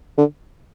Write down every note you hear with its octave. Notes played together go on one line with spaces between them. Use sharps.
D3